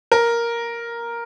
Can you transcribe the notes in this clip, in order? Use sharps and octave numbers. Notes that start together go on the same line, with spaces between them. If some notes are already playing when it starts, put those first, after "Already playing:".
A#4